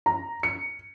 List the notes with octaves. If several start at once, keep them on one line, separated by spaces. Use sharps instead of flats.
A#5
C#7